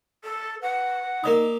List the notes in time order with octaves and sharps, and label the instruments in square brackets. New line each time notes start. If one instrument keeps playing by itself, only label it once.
[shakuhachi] A4
[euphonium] B4 [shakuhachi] F#5
[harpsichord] A#3 G4 A#5 [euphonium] D#4 [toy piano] A#4 D5 D#6